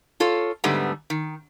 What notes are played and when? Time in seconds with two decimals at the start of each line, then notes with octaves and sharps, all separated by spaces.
0.20 F4 A4 C#5
0.64 G#2 D3 G3 A3 B3
1.10 D#3